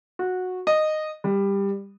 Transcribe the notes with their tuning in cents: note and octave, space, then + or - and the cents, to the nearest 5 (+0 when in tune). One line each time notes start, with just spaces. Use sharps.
F#4 -15
D#5 -10
G3 +15